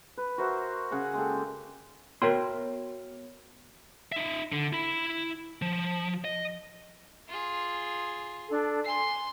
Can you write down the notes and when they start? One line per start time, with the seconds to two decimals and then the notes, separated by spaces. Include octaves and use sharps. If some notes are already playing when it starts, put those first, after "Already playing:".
0.18 B4
0.38 F#4 A#4 C5 E5
0.91 C#3 G#4 F#5 C#6
1.14 G#3 A#3 G4 A4
2.22 B3 F#4 A#4 C#5 G5 C6
4.12 D#4 E5
4.52 D3
4.73 E4 B5
5.62 F3
6.24 D#5
7.28 F4 G#4
8.48 D4 A4
8.85 G#5 C6 C7